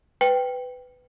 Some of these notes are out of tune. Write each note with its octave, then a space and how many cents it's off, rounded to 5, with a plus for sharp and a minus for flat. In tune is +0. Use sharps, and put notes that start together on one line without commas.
B4 +15 G5 +0